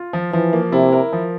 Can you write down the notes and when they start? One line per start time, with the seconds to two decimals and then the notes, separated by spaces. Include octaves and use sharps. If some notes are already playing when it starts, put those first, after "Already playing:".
Already playing: F4
0.13 F3
0.32 E3 F3
0.53 A#3
0.72 C3 E4
0.93 A#4
1.13 F3